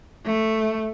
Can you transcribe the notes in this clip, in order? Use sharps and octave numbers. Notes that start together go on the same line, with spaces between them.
A3